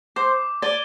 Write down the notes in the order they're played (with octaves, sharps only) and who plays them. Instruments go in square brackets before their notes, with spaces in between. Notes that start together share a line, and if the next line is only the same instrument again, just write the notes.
[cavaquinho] C5 [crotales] D6
[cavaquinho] D5 [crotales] G#6 D#7 G7